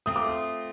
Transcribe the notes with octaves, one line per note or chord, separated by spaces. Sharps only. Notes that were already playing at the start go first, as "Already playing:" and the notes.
A3 C4 F4 D#6
D6
D#6